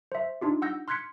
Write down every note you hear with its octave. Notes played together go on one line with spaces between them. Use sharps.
C5 E5
D4 D#4 F4 G4
F#5 E6 G6 A#6
C6 F6 F#6 G#6 B6 C#7